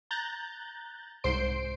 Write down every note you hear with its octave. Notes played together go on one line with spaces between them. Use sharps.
A#5 F#6 G6 A6
C2 G#2 C5 C6 C7 D7